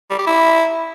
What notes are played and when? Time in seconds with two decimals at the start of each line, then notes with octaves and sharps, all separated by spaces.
0.11 G3
0.19 G4
0.27 E4